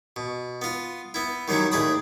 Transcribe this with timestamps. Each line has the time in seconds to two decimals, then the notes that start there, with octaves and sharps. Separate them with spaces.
0.16 B2
0.62 B3 F4
1.14 B3 E4
1.48 D#3 F#3 G3 C#4 E4
1.72 D#2 A2 G#4 D5 B5 D#6